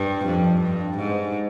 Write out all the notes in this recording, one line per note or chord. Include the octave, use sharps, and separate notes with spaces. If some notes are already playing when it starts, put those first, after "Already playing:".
Already playing: G2
F2
G2
G#2